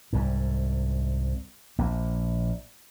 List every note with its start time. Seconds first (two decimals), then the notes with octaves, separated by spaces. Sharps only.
0.13 C2 G#2
1.79 A#1 A#3